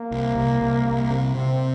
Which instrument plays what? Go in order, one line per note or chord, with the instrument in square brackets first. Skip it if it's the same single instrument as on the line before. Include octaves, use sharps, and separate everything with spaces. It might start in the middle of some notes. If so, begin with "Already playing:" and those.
Already playing: [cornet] A#3
[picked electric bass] C2
C2
C2
C2
C3
[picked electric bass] C3 [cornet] C4